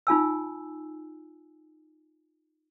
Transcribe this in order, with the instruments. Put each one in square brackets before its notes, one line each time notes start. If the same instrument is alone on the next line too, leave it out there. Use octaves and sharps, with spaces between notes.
[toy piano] D#4 F4 G#5 E6